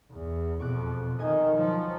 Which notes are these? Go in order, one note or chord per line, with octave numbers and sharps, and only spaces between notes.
E2
F2 B2 C#6 D6 F#6
D#3 D#5 G#5
F3 F#3